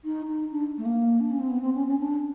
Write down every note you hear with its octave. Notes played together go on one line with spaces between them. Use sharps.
D#4
D#4
D4
A3
A#3
D4
C#4
C4
B3
C4
C#4
C#4
D4